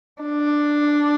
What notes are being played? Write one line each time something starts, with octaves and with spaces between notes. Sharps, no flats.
D4